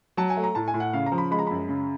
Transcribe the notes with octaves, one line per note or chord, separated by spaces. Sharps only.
F#3 A5
G#5
A3
A#5
A2 A5
G#5
A2
F#5
C#3 F5
A#5
F3
B5
G#3 B5
A#5
F#2 B5
C#3